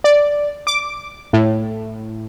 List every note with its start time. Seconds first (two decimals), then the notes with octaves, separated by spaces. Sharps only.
0.04 D5
0.67 D6
1.33 A2